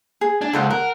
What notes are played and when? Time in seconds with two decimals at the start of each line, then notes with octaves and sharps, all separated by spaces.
0.21 G#4
0.41 D4 G#5
0.53 C#2 A4 C5 F#5
0.70 A#4 F#5